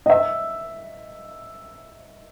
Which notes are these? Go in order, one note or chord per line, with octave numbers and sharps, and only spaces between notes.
D#5
E5